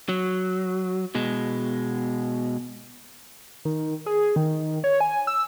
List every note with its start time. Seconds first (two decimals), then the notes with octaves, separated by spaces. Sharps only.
0.09 F#3
1.15 B2 G#3
3.65 D#3
4.06 G#4
4.36 D#3
4.84 C#5
5.01 G#5
5.27 E6